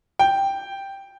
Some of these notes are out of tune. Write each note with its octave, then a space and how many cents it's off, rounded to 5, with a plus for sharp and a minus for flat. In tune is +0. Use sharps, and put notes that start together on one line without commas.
G5 +0